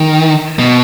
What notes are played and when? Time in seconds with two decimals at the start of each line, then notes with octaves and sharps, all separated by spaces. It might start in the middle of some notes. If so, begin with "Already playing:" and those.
Already playing: D#3
0.59 B2